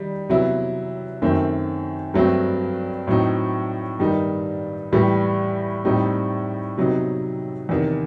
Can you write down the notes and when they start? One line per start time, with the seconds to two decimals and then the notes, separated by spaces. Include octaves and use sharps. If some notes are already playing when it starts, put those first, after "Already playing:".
Already playing: D#3 G3 D#4
0.29 C3 F#3 B3 E4
1.22 F#2 D#3 A3 C4
2.14 G2 F#3 A3 C4
3.07 A2 F#3 C4 D#4
3.99 G2 D#3 G3 D#4
4.92 A2 E3 G3
5.85 A2 G3 C4 D#4
6.78 C3 F#3 B3 D#4
7.69 E2 C3 D#3